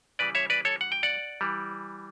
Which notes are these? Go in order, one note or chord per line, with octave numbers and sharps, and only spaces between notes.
C#3 E3 G3 B4 D5
C#5 E5
B4 D5
A4 C#5
F#5
G5
D5 F#5
E3 G3